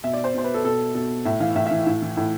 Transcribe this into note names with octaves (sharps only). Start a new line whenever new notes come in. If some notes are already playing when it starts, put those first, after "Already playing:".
B2 E5
D5
C5
B2 C5
B4
A4
B2 A4
B2 A4
A2 E5
E3 F5
A2 E5
E5
E3
A2 E4
E3
A2 E4